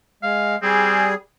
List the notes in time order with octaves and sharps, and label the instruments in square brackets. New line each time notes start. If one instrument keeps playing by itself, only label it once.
[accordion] G#3 [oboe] F5
[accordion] G3 G#4 [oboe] C4